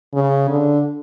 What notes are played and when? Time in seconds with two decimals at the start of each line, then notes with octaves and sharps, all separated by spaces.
0.14 C#3
0.49 D3